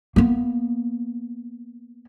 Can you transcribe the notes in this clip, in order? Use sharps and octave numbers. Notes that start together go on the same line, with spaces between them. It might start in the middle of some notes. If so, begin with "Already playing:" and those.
A#3 B3